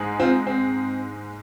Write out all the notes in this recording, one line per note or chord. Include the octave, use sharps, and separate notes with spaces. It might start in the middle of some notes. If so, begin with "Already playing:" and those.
Already playing: G#2 G#3 D#4
C4 F4
C4